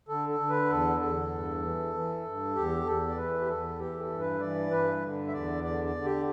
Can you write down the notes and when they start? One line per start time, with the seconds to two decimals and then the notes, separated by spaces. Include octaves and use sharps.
0.08 D3 A4
0.29 A4
0.40 D3
0.50 B4
0.70 E2 A4
1.01 E2 A4
1.32 G2
1.62 E3
1.94 E3
2.24 G2
2.55 E2 G4
2.86 E2 A4
3.09 D5
3.17 E3 B4
3.41 G4
3.48 E2 A4
3.79 E3 G4
3.99 A4
4.10 G2
4.20 B4
4.40 E3 D5
4.71 G2 B4
5.02 D3
5.27 E5
5.33 E2 D5
5.64 D3 D5
5.84 D5
5.95 D3
6.05 G4